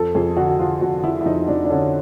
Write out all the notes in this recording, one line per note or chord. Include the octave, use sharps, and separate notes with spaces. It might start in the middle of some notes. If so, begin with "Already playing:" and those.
Already playing: F2 A4
F2 G#4
D3 F#4
F#4
F3 F4
F2 F#4
F3 E4
E4
F2 D#4
F2 D4
D4
D3 C#4